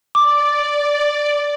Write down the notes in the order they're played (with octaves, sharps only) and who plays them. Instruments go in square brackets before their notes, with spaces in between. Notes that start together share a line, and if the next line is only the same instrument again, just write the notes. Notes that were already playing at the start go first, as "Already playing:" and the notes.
[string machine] D5 [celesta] D6